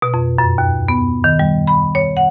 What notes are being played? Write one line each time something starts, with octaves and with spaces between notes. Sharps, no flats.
B2
F2
F#2
D#2
B3
D#3
G3
B5
C#5
F#5